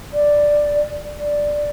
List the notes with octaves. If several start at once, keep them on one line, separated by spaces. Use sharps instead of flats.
D5
D5